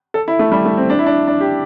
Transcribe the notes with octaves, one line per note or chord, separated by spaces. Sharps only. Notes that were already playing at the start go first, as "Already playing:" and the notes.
A4
E4
A3
G3
A3
C4
D4
E4
D4
D4
G4